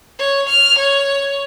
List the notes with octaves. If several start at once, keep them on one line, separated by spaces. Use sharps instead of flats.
C#5
F6
C#5